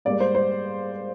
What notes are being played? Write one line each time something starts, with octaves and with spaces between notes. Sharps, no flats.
G#2 G3 A#3 D5
C5
C5